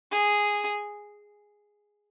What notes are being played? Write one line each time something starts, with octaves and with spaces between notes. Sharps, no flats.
G#4